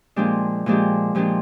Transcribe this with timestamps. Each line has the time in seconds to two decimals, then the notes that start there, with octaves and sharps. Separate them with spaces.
0.16 A#2 F3 G#3 D4 G4
0.66 A#2 F3 G#3 D4 G4
1.15 A#2 F3 G#3 D4 G4